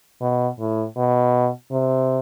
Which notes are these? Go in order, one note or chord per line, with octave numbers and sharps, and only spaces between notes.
B2
A2
B2
C3